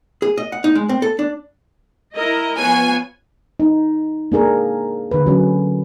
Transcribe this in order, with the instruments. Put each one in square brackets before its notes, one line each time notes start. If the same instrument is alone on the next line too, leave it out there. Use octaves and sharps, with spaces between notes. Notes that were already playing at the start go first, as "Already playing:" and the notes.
[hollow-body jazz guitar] G#4
D#5
F#5
D#4
G#3
C4
A4
D4
[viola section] E4 A#4 D#5
[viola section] F3 B3 C#5 [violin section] G#5
[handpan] D#4
A#3 D4 G#4 A#4
D3 B4
F#3 C#4